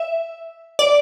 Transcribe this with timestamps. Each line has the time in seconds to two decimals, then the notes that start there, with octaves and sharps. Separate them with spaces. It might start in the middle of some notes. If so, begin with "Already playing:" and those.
Already playing: E5
0.79 D5